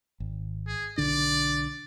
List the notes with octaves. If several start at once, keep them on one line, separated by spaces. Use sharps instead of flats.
G#1
G#4
B1 D3 D4 D5